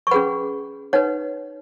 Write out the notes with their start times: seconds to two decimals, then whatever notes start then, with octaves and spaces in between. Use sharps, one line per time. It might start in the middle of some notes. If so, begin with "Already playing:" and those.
0.07 C#6
0.11 C#4 G#4 B4 F#5 B5
0.93 D#4 B4 C#5 F#5